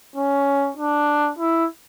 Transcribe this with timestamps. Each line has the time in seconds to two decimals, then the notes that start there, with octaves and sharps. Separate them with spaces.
0.16 C#4
0.77 D4
1.39 E4